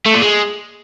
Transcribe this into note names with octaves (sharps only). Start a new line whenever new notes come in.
A3
A#2
G#3